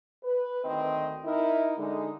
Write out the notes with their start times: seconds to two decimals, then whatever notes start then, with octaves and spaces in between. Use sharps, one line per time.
0.24 B4
0.64 D2 D#3 C4 D#5
1.25 D#4 E4 A#4
1.77 D3 G#3 D#4